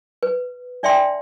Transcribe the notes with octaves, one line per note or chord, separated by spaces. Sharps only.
B4
D4 D5 E5 G5 C6